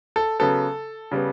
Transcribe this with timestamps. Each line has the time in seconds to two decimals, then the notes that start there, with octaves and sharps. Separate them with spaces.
0.16 A4
0.39 C#3 F#3 B3 A4
1.11 C#3 G3 B3